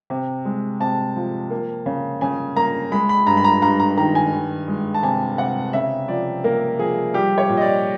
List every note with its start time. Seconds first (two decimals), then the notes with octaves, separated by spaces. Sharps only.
0.10 C3
0.45 G#3
0.80 C3 A5
1.16 F3
1.51 A#3
1.86 C#3
2.21 C#3 G#5
2.56 A#3 A#5
2.92 G#3 B5
3.09 B5
3.26 G2 A#5
3.37 B5
3.44 A#5
3.62 G2 A#5
3.80 A#5
3.97 D#3 A#5
4.15 G#5
4.33 D#3
4.68 G#3
4.94 A5
5.03 C3 G#5
5.38 C3 F#5
5.73 C#3 E5
6.08 F3 D5
6.44 A#3 A#4
6.79 F3 G#4
7.14 G3 G4
7.38 C#5
7.49 A#2
7.57 D#5
7.61 D5